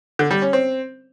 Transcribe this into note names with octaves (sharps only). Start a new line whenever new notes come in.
D3
G3
C#4
C4